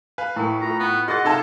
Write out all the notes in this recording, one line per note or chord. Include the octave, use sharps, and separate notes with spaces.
B4 F5 G#5
A2 E4 A#4 G#5
F4 A4 A#5
B3
F#4 G#4 A#4 D#5 F#5 C6 F#6 A6
C3 D#4 A4 F5 A5 C6 G#6